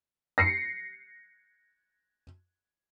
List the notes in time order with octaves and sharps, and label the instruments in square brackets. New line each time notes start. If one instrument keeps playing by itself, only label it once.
[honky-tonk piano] A#6 C7 C#7